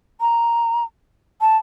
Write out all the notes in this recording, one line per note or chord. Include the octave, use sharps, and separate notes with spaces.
A#5
A5